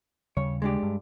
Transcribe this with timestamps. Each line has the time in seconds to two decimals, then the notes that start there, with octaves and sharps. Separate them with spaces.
0.37 D#2 C#3 G3 C#5
0.62 G#3 D4 G4
0.83 G2